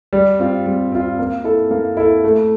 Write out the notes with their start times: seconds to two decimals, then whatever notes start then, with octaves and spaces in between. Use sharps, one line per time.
0.13 G3
0.40 C4 F4
0.66 G3
0.92 C4 F4
1.19 A#3
1.44 E4 A4
1.71 A#3
1.97 E4 A4
2.24 A3